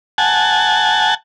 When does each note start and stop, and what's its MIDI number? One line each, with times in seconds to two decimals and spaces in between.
0.18 1.14 78
0.18 1.14 80
0.18 1.14 81